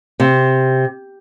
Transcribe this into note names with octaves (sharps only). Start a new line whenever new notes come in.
C3